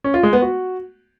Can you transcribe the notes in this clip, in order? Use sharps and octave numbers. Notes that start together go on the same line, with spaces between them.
C#4
F4
G#3
B3
F#4